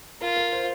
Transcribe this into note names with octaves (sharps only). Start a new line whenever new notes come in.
F4 A#4
A#4
C5